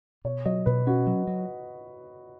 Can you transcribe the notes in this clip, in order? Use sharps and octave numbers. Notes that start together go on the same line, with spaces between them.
B2 C#5
F#3 D#5
B2 B4
C#4 F#4
F#3
F#3